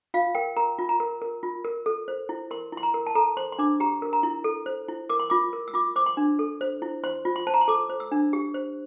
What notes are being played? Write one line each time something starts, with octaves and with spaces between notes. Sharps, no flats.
F4 F5
A#4 G5
A#4 A#5
F4
A#5
A#4
A#4
F4
A#4
A4
C5
E4
A#4 C6
E4 C6
A#5
A#4
A5
A4 A#5
C5 C6
C6
D4 D6
G4 A#5
A#4
A#5
E4
A4
C5
E4
A#4 D6
C6
F4 D6
A#4
E6
F4 D6
C5 D6
C6
D4
A4
C5
E4
C5 C6
F4
C6
C5 A5
A#5
C6
A4 D6
C5
E6
D4
G4
C5